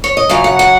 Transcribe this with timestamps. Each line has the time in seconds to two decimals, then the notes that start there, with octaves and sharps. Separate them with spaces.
0.04 C#5
0.17 D#5
0.29 F#2 C#3 F#3 F5
0.44 F#5
0.59 F#5